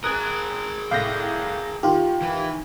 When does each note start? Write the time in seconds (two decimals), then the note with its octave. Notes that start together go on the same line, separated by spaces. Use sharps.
0.04 G#4 A#4 D#6 F#6 G#6
0.91 C2 A2 F5 G6 A#6
1.83 D#3 F4 G4
2.22 E3